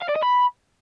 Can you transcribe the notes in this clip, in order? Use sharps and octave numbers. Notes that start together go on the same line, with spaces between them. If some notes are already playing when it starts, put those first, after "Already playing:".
F5
D5
D#5
B5